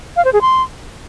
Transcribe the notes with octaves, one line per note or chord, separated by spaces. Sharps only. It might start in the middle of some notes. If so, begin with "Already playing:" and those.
F5
C5
G#4
C6